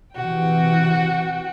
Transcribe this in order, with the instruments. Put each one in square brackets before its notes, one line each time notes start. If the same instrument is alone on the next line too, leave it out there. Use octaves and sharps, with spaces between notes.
[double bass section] C3 E3 [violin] F#4 G5